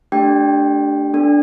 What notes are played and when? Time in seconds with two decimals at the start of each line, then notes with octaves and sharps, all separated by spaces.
0.12 A3 D4 G4 G5
1.13 B3 D4 A4